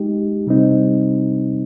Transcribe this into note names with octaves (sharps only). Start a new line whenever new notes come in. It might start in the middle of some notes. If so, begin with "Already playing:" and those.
Already playing: G#3 D#4 G4
C3 G3 C4 D#4